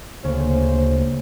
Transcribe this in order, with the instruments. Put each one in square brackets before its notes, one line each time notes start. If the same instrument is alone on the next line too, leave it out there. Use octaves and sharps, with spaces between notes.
[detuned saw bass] D2 [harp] C#3 [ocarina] A#3 [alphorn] C5